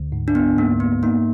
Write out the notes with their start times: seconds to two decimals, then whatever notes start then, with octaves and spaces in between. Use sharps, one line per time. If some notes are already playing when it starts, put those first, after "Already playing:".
Already playing: D2 D3
0.12 G#2
0.28 D4
0.35 B3
0.58 G#2 A#3
0.80 B3
1.03 A#3 D#4